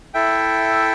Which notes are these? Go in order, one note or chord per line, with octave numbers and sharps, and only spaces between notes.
E4 A4 E5 G5